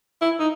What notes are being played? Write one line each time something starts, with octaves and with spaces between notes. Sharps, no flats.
E4
D#4